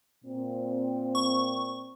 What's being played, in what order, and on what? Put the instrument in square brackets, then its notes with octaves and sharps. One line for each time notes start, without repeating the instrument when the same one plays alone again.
[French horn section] A#2 C4
[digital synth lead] C#6